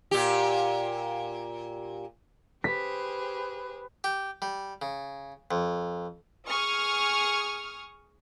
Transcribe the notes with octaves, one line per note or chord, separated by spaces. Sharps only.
A#2 G4
G4 G#4 B4 C5 B6
G4
G3
C#3
F2
G#4 C#6 D#6 F6